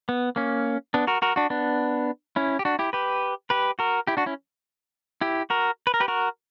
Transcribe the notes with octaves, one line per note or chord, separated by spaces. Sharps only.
B3
A#3 C#4
B3 D4
F#4 A#4
F#4 A#4
D4 F#4
B3 D4
C#4 E4
G4
D4 F#4
E4 G4
G4 B4
G4 B4
F#4 A#4
E4 G4
D4 F#4
C#4 E4
E4 G4
F#4 A#4
B4
A#4
G4 B4
F#4 A#4